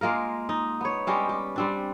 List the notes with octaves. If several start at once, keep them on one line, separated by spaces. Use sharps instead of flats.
G#3 A#3 F4 A#4
D#4
B3 C#5
G3 G#3 C#4 G4
G4
G3 C4 D4